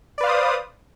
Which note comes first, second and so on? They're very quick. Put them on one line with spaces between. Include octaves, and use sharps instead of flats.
D5 B4 F5 C5 D#6